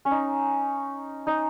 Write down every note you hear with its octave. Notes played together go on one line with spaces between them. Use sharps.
C#4
D#4
D#4